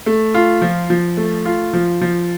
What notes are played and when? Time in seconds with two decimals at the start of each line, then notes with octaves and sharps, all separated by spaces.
0.06 A3
0.34 F4
0.62 F3
0.90 F3
1.17 A3
1.45 F4
1.73 F3
2.01 F3